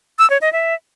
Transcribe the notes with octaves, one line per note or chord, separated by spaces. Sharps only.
E6
C#5
D#5
E5